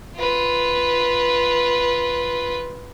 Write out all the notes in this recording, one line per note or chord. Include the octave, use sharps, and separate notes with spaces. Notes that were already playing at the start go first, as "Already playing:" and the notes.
F4 B4